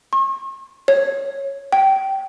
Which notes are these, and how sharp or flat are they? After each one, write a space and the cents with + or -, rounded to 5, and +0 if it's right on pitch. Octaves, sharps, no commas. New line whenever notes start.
C#6 -45
C#5 -10
G5 -20